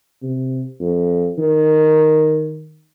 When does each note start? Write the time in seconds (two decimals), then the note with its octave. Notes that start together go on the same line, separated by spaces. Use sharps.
0.22 C3
0.80 F2
1.38 D#3